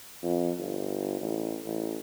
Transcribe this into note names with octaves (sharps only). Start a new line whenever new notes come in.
F2
G1
A1
A1